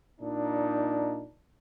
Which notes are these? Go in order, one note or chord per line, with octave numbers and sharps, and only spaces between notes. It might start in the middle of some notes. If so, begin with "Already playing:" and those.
A#2 D4 D#4